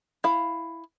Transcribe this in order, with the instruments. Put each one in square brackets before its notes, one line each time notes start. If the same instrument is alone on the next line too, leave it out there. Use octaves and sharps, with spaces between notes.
[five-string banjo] E4 F5